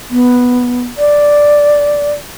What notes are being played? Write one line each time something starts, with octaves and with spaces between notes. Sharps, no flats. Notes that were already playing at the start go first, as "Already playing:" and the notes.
B3
D5